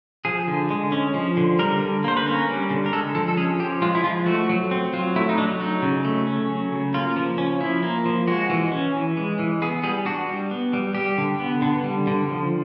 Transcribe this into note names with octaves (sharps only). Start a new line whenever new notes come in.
F3 G#4
D3
G#3
C#4
F3
D3
G3 A#4
D3
A#3 C5
B4
C#4 A#4
G3
D3
A#4
G#3 A4
F3 A4
A4
C#4 G#4
F3 G4
G#3 F4
E4
F3 F4
A3 F#4
F#3
C4
F#3 F4
A3 E4
D#4
F#3 D4
F#3 D#4
C#3
A3
C#4
F#3
C#3
A#3 F4
F3
C#4
F3 E4
A#3
F3
G#3 F#4
E3
C#4
E3
G#3
E3
B3 G#4
G3 G#4
D4 F#4
G3
B3
G3
G3 G4
D3
B3
D3
G3
D3
F3